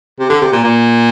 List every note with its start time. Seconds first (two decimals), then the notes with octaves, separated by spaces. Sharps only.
0.20 C3
0.29 D3
0.41 C3
0.52 A#2
0.64 A#2